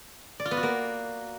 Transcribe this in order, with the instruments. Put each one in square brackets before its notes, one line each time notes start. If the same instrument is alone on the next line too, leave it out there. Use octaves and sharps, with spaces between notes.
[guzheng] D5
F4
B3
F#4
A#3